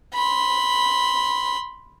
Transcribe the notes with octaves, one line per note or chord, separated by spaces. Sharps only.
B5 C6